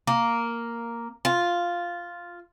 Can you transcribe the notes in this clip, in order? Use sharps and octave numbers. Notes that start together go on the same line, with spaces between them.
A#3
F4